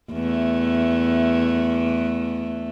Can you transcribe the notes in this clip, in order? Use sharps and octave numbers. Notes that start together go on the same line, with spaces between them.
E2 A3